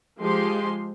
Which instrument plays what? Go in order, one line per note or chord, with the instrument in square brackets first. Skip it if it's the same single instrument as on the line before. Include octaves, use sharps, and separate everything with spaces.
[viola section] F3 G#3 G4 C6